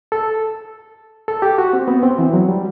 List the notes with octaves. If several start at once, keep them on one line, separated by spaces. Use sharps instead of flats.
A4
A4
G4
F#4
C4
B3
C4
E3
F#3
G3